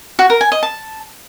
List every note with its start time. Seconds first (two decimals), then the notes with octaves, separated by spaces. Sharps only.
0.19 F#4
0.30 A#4
0.41 G#5
0.52 D#5
0.63 A5